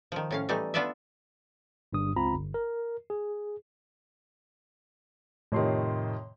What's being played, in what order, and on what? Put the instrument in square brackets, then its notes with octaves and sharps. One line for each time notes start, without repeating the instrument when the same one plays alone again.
[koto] D#3 F3
A2 C#4 F5
E3 G3 A3 D#4
B3 D4 F4 B4 D5 E5
[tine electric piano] G1 G2 D#6
C#2 C4 F4 A#5 B5
G1
A#4
G#4
[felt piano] F2 C3 D#3 [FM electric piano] A2 C#5 C6